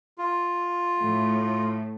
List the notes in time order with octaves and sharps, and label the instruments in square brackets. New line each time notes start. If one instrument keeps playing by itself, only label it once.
[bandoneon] F4
[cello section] A2 A3